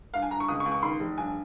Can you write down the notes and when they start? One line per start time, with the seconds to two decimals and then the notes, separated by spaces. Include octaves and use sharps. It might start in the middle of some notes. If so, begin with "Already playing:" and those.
0.14 G2 F5
0.22 G#5
0.31 G2 A#5
0.40 C#6
0.48 C#2 D#6
0.60 C#6
0.66 C#2
0.72 C#6
0.83 D#3 C6
1.00 F1
1.18 G2 G#5